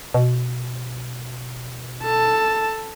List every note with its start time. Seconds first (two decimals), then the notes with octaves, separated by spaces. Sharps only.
0.14 B2
2.03 A4 A5